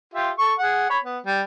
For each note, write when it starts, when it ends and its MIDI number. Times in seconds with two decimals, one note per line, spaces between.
0.14 0.31 65
0.14 0.31 67
0.14 0.31 76
0.39 0.53 69
0.39 0.53 85
0.59 0.88 68
0.59 0.88 78
0.90 0.98 73
0.90 0.98 83
1.04 1.19 59
1.26 1.42 55